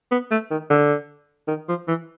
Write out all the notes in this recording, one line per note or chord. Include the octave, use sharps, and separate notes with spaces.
B3
A3
D#3
D3
D#3
F3
E3